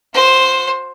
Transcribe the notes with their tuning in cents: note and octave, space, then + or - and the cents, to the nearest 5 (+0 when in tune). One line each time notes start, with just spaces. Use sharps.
F#4 -40 C5 +0